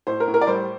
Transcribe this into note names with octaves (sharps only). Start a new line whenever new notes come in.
A2 C5
A#4
A2
A#4
D5
G3 C5